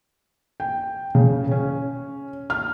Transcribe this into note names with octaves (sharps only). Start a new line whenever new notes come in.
G5
C#3
C#4
F6